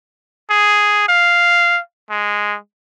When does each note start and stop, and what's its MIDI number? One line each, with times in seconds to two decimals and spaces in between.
0.50 1.04 68
1.08 1.80 77
2.10 2.57 56